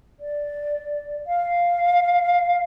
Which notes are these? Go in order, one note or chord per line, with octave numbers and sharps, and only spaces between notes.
D5
F5